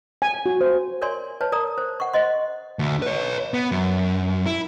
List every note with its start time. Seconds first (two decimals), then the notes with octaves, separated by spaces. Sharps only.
0.22 G#5
0.46 F#4
0.61 C5
1.02 A#4 C#5 D5 G#5 C6
1.41 B4 C#5 A5
1.52 A#4 D5 A#5 D#6
1.78 C5
2.00 F#5 C#6
2.13 C5 D#5 C6
2.79 D2
3.02 B4 C#5
3.54 B3
3.72 F#2
4.46 E4